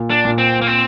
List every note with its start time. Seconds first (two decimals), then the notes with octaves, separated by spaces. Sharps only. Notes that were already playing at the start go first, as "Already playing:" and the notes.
Already playing: A#2
0.10 D4
0.25 A#2
0.38 C4
0.61 A#3
0.67 C4